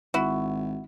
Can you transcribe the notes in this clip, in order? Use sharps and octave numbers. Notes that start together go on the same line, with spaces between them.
G#1 E4 F#4